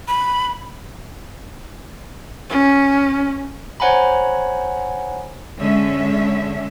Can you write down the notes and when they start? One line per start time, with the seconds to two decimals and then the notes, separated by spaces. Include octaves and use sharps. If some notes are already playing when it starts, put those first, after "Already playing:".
0.08 B5
2.50 C#4
3.80 C5 C#5 F#5 G#5 A#5 B5
5.59 D3 G#3 C#4 E5